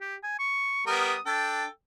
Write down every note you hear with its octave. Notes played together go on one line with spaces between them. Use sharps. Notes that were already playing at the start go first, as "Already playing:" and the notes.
G4
G#5
C#6
G3 B3 A#4 D#6
D4 A4 G5